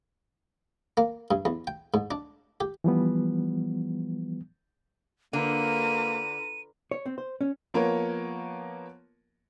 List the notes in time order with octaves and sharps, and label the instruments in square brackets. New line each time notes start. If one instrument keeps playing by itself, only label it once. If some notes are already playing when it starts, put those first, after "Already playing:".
[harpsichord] A#3
G2
E2
G5
G#2
D4
G4
[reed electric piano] E3 F3 G3 B3
[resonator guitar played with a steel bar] D3 [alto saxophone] A#3 [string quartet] F4 B4 A#5 [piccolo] D#7
[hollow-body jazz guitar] C#5
C4
C5
C#4
[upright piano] F3 A#3 B3 A#4 C#5